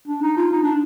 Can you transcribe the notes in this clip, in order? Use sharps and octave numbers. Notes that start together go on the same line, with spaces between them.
D4
D#4
F4
D#4
D4